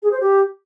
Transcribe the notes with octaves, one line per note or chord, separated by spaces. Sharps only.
G#4
C5
G4